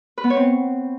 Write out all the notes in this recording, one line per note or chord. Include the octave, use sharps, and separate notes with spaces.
B4
B3
C#5
C4